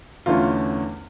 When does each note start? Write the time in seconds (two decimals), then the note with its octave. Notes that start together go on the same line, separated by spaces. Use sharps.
0.26 E2 D3 A3 C#4 F4